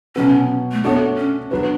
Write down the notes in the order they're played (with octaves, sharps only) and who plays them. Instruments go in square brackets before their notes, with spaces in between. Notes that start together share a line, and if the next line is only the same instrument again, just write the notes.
[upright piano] B2 F#3 B3 [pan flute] C#4
[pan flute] A3
[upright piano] A3 D4 F#4 A4 C#5 [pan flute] B3
[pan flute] C#4
[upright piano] F#3 B3 F#4 B4 [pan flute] D4